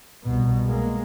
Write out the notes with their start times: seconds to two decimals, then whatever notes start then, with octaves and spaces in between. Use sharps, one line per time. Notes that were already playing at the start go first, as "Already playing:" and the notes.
0.23 C2 B2
0.65 G#3 A#3